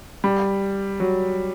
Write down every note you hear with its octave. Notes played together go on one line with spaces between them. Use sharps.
G3
F#3